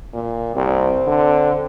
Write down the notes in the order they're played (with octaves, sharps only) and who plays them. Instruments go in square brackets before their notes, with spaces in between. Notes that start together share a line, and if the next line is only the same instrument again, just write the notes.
[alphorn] A#2
[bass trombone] C2 [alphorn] C4
[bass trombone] D3